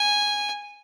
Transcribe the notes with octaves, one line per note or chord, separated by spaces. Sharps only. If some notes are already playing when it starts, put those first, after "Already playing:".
Already playing: G#5